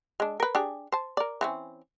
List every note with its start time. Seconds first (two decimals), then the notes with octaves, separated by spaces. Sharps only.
0.20 G#3 D4
0.40 A#4 B4
0.55 D4 G4 G#4
0.92 C5 A5
1.17 A#4 D5
1.41 E3 C4 C#4